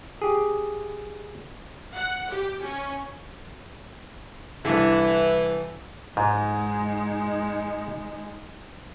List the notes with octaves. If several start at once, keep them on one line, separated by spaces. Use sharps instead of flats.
G4 G#4
F#5
G4
C#4
C2 D3 E3
G#2 G#3 D#4